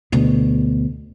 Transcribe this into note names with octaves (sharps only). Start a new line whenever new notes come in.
D2 B2